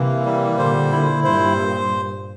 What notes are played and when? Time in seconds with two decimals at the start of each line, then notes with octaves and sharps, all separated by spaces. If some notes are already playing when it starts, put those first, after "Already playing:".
Already playing: C3 E3 A#3
0.25 G3
0.58 A#2 D3 C5
0.92 E4
1.24 G2 A#2 C5